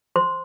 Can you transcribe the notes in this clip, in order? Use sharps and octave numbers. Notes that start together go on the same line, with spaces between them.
C5 C6